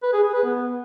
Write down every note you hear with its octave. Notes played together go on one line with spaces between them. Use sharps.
B4
G#4
G#4
B4
B3